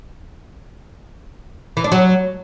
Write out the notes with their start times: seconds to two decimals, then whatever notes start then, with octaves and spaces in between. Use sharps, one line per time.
1.77 E3
1.84 D4
1.92 F#3